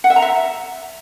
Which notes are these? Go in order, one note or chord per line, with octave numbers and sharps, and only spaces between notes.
F#5
E5
A#5
E5